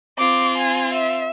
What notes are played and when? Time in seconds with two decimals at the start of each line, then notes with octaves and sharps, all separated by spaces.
0.18 C4 F4 D6
0.58 G#5
0.93 E5